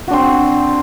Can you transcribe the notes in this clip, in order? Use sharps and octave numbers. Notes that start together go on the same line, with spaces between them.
C4 D4 F#4